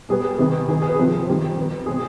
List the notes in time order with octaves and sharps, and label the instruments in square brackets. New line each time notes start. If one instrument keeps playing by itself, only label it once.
[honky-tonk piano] B2 G3 B3 G#4
C3 D#3 B3
D#3 B3 G#4
G#4
B4
C3 F3 C4
D#3 G3 C4
D#3 B3
B2 G#3 C4 G#4